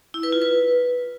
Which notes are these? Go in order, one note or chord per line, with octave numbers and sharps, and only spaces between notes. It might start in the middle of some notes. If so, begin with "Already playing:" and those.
E4
B4
F4
B4